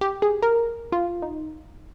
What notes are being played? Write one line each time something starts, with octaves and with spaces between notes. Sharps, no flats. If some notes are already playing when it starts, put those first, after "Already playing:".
G4
G#4
A#4
F4
D#4